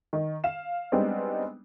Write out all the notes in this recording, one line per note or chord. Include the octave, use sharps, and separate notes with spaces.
D#3
F5 E7
G3 G#3 B3 C4 D4 D#4